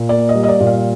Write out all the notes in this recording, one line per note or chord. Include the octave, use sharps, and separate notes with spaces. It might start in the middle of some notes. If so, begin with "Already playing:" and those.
Already playing: A#2
A#3 D5
D#5
G3
D#5
D5
A#2
F5